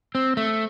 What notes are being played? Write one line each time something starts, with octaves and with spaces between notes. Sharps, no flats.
C4
A3